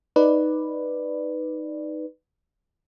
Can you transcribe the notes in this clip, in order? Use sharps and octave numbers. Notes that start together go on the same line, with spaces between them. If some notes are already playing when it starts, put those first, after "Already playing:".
D#4 B4 D5